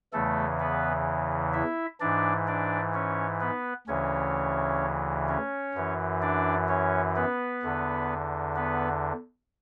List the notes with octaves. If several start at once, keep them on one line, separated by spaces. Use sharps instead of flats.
E2 C#3 E3 A3 A4
B3 B4
E4 E5
G#2 E3 D4 D5
D4 D5
C#4 C#5
B3 B4
D2 C#3 E3 C#4 C#5
C#4 C#5
F#2 E3
D4 D5
C#4 C#5
B3 B4
E2 D3
B3 B4